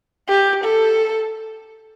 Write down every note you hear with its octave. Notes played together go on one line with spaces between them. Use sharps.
G4
A4